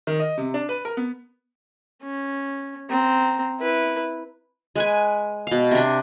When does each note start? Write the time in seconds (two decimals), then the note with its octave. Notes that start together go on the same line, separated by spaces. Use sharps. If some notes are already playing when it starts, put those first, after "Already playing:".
0.07 D#3
0.20 D#5
0.38 C3
0.54 D4
0.69 B4
0.85 A#4
0.97 B3
2.02 C#4
2.90 C4 A#5
3.60 E4 B4
4.76 G#3 B4 G#5
5.47 B2 F5
5.71 C3 D4